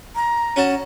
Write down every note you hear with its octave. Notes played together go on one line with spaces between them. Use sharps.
A#5
C#4 F#4 A5